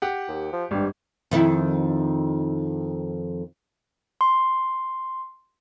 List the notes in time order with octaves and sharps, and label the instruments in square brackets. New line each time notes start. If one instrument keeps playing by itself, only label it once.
[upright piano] G4 F#5
[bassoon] D#2
F3
[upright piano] G#1 [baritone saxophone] G2 [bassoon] G3
[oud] F2 D#3 E4
[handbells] C6